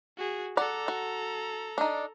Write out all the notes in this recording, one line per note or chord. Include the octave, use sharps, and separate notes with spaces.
F#4 G#4
A4 D5 F#5 A#5
F#4
D4 D#4